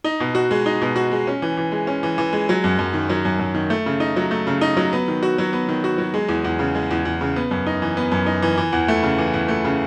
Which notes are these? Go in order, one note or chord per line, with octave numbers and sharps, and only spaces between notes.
D#4
B2
F#4
G#3
D#4
B2
F#4
G#3
C#4
E3
E3
G#3
C#4
E3
E3
G#3
F#3
F#2
F#2
D#3
F#3
F#2
F#2
D#3
A3
C#3
D#4
F#3
A3
C#3
D#4
F#3
B3
D#3
F#4
F#3
B3
D#3
F#4
F#3
G#3
E2
E2
C#3
G#3
E2
E2
C#3
B3
F#2
D#4
E3
B3
F#2
D#4
E3
E3
E2
A3
C#3
E3
E2
A3
C#3